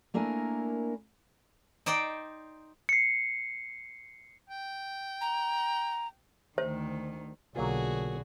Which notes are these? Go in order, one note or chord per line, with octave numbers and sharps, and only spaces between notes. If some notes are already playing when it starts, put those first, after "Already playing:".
A3 A#3 D4 E4 A#4 G#5
D#4 C5 D5 G5
C7 C#7
G5
A#5
D2 D#3 C5
B1 D3 F#3 A#3 F4 F#4 G#4